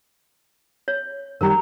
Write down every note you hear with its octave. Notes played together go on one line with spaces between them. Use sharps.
C#5
D#3 G3 G4 A#4 A#5